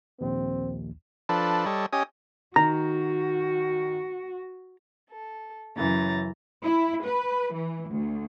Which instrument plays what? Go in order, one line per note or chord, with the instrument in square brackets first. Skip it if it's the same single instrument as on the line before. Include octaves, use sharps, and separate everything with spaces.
[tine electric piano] A#1 D#2 [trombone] C4
[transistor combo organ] F3 D4 A4 B4
G3 A4 C#5 D#5
C#4 G4 D#5 G#5 D#6
[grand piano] D#3 [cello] F#4 [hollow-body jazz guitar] A#5
[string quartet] A4
F#2 C#3 E3 A#5 A6
[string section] E4
B4
E3
D2